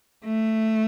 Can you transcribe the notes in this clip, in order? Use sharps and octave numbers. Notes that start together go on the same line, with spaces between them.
A3